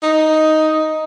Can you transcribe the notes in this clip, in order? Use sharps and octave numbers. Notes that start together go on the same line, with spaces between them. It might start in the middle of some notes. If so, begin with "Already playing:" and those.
D#4